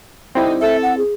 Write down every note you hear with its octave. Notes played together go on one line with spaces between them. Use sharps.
D3 G3 C4 D#4 E4
A4 E5
F#5
G#4